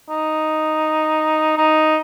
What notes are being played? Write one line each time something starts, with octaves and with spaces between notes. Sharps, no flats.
D#4
D#4